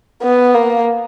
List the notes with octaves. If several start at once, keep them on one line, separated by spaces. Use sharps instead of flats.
B3
A#3